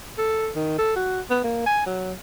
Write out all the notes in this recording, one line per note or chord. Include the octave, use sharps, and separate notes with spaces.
A4
D#3
A4
F#4
B3
A#3
G#5
F#3